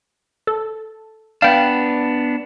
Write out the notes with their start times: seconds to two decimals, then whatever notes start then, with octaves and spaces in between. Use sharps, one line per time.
0.47 A4
1.42 B3 D4 F5 G5